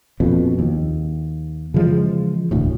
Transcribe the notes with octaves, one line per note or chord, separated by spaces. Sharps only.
A#1 F2 B2
D#2
C#3 E3 F3 G#3
E1 D2 A2